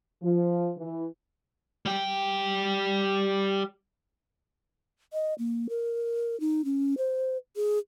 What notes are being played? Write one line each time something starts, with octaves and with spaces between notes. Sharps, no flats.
F3
E3
G3 G5
D#5
A#3
A#4
D#4
C#4
C5
G#4